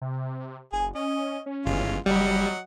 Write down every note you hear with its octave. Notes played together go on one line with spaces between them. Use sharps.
C3
F#1 G#4 G#5
C#4 D#5
C#4
G1 E3 G#3 F4
F#1 F#3 G3 D#5 F#5